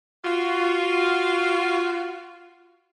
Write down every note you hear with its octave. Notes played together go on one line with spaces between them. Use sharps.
F4 F#4